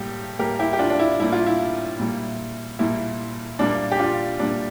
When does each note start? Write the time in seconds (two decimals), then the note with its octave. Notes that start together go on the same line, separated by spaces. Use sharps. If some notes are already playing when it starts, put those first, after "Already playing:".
Already playing: A2 G3 A#3 G4
0.39 A2 G3 A#3 G4 A#4
0.59 E4 G4
0.73 G4
0.79 D4 F4
0.90 D4
0.99 E4
1.19 A2 G3 A#3 E4
1.32 F4
1.46 E4
1.99 A#2 G3 A#3
2.79 A#2 G3 A#3 E4
3.59 A#2 G3 A#3 D4
3.92 G4
3.99 D4 F4
4.39 A#2 G3 A#3 D4